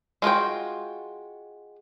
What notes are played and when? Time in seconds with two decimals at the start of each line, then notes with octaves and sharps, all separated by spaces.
0.22 G#3 F4 F#4 G5